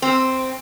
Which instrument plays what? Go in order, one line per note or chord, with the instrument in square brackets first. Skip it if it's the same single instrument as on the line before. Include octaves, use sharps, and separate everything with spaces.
[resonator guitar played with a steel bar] C4